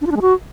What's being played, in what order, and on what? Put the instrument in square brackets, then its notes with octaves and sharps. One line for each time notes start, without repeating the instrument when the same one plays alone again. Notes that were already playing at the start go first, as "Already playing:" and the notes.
[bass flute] D4
F4
D4
G#3
F#4